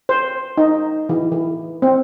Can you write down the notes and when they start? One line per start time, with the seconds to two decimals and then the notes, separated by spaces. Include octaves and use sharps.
0.09 C5
0.57 D#4
1.09 E3
1.32 E3
1.82 C4